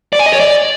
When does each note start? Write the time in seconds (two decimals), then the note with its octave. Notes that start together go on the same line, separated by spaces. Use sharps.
0.13 D5
0.19 G#5
0.26 D#5
0.33 C#5
0.40 D5